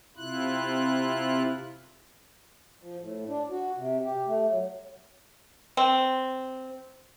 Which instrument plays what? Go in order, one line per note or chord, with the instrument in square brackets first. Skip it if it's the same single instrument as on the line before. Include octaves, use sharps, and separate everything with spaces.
[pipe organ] C3 E4 F4 F#6
[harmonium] F3
A2
D4
F#4
C3
G4
A3
F#3
[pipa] C4